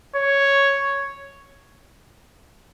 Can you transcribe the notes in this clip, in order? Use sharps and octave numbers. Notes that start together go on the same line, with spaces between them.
C#5